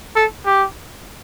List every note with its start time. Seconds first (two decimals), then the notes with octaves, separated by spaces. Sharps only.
0.16 A4
0.46 G4